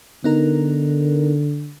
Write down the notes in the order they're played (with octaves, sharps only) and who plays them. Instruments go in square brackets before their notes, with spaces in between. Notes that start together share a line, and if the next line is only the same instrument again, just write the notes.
[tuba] D3 [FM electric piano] B3 D#4 A#4